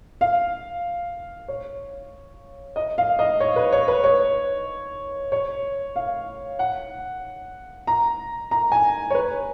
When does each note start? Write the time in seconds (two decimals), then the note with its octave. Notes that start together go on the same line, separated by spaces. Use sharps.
0.21 F5
1.48 C#5
2.76 D#5
2.98 F5
3.19 D#5
3.40 C#5
3.56 B4
3.72 C#5
3.88 B4
4.04 C#5
5.32 C#5
5.96 F5
6.59 F#5
7.87 A#5
8.51 A#5
8.72 G#5
9.10 C#5
9.15 B4